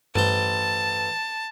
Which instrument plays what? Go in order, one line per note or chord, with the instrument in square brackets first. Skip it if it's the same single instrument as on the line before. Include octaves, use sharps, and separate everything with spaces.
[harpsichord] A1 C5 [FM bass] G2 [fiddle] A5